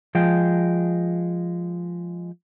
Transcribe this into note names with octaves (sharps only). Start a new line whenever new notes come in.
F3 G#3 G5